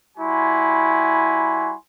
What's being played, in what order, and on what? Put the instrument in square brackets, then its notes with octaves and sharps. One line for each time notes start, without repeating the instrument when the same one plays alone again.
[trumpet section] G3 E4 F#4 G#5 C6